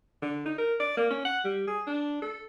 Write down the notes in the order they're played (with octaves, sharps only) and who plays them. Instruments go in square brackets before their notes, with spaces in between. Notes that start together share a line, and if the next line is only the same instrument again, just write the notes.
[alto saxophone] D3
D#4
A#4
D5
A#3
C#4
F#5
G3
G#4
D4
A4